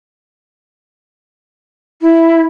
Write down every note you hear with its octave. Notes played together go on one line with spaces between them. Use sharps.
E4